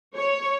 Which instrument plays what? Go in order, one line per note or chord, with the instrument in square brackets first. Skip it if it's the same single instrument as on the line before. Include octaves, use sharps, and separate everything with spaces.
[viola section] C#5